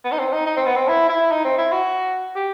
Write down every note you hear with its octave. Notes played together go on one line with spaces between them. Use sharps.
B3
D#4
C4
D#4
D#4
C4
B3
C4
E4
E4
D#4
C4
E4
F#4
G4